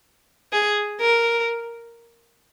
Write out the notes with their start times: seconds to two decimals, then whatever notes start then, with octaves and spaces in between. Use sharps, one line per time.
0.53 G#4
1.00 A#4